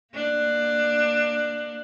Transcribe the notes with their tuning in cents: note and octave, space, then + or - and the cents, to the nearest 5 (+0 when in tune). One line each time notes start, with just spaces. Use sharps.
A#3 +0 D4 +15